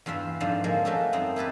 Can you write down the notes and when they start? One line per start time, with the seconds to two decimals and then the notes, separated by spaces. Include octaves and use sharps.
0.06 E2 G2 F4 E5
0.40 G#2 D3 F3 C4 D4
0.64 F3 G#3 A#3
0.85 A3 C#4 F#4 G4 A4
1.13 F#2 C4 D#4
1.36 E4 G4 A4 B4